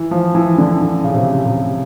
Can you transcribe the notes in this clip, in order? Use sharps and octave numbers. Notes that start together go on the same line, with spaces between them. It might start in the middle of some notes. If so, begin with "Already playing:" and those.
Already playing: E3
F3
E3
D3
D3
C#3
C3
C3